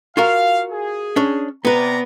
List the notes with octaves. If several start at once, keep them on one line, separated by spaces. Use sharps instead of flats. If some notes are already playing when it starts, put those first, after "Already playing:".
F4 F#4 A#4 F5
G#4
C#4 D4
C3 B3 B4 D5 A#5